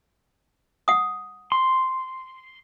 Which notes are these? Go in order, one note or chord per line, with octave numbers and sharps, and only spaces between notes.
F#5 D#6
C6